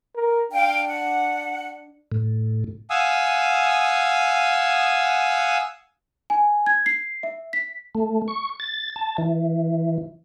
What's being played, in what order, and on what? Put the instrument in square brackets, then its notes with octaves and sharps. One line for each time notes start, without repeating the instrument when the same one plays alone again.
[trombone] A#4
[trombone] D4 [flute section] F5 G5
[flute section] F#5
[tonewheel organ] A2
[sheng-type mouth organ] F5 F#5 G#5 D#6 E6
[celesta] G#5
G#6
C7
E5
B6
[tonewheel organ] A3
C#6
A6
A5
E3